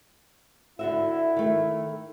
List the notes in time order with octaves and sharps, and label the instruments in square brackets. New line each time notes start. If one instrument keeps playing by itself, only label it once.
[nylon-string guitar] D3 F#4 E5 [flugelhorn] E4
[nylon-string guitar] D#3 A3